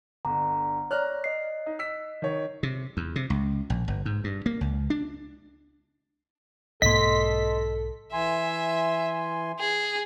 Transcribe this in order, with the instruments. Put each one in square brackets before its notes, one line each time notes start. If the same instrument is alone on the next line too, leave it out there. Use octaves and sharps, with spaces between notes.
[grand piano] G1 D3 [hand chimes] A#5
[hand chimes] C#5 D5 [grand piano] A#5 F6 F#6
[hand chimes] D#5 C7
[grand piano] D#4
E6 B6
D#3 C#5
[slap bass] C3
E2
C3
C#2
A#1
G1
G#2
G2
A#3
C#2
D4
[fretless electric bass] B1 G#2 A#3 [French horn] A4 [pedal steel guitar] D#5 C6 [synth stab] B6
[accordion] E3 G#5 C6 [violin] E5
[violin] G#4